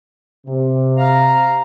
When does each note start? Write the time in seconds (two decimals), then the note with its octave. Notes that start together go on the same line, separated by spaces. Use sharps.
0.47 C3
0.97 F5 A#5